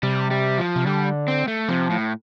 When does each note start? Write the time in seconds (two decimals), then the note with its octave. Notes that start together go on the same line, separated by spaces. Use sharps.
0.03 C3 G3
0.31 G3
0.58 F3
0.76 C3
0.86 D3 G3
1.28 C4
1.48 A3
1.68 C3 F3
1.90 A2